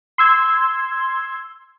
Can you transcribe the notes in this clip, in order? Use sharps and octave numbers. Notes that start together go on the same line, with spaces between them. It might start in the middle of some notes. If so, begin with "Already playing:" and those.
C6 E6 G#6